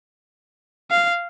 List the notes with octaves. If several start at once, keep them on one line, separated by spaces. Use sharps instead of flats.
F5